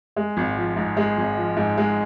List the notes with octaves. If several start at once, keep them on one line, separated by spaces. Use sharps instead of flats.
G#3
G#1
F3
G#2
G#3
G#1
F3
G#2
G#3